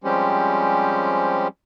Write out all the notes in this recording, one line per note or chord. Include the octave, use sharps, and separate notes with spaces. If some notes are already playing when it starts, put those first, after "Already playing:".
F3 G3 G#3 C4 C#4 G4